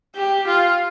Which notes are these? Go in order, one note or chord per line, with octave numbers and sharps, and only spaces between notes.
G4
F4